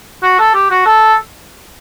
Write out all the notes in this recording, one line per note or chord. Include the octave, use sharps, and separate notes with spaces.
F#4
A4
G4
F#4
A4